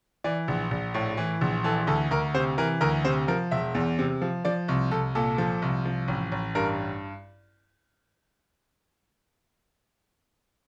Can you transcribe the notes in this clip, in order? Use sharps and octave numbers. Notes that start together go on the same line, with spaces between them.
E3 D5
A#1
A#1
A2
E3
A#1
E3 A4
D2 A4
D2 A#4
C3 C5
E3 A#4
D2 A#4
C3 C5
F3 A#4
E1 E5
E2
C3
F3
F3 D5
C2
C2 A4
A#2 A4
F3
C2
F3
A1
A1
G2 A#4